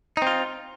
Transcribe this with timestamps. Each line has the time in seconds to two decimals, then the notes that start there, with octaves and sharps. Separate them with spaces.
0.17 D#4
0.22 C4
0.27 F4